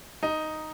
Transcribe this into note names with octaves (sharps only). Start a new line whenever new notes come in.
D#4